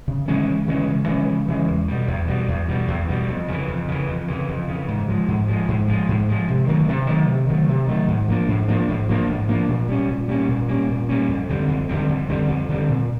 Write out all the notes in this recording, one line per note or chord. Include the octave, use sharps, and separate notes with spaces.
C#3
E3 G#3 C#4
C#3
E3 G#3 C#4
C#3
E3 G#3 C#4
C#3
E3 G#3 C#4
E2
B2 G3
E2
B2 G3
E2
B2 G3
E2
B2 G3
F2
C#3 E3
F2
C#3 E3
F2
C#3 E3
F2
C#3 E3
G#2
F3 G#3
G#2
F3 G#3
G#2
F3 G#3
G#2
F3 G#3
C3
D#3 F#3 A3
C3
D#3 F#3 A3
C3
D#3 F#3 A3
C3
D#3 F#3 A3
G#2
F3 A#3 D4
G#2
F3 A#3 D4
G#2
F3 A#3 D4
G#2
F3 A#3 D4
A#2
G3 A#3 C#4
A#2
G3 A#3 C#4
A#2
G3 A#3 C#4
A#2
G3 A#3 C#4
F2
D3 G3 C4
F2
D3 G3 C4
F2
D3 G3 C4
F2
D3 G3 C4
A#2